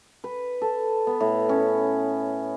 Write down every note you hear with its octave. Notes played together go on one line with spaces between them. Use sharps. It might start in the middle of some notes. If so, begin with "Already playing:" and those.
B4
A4
B3
A2
C#4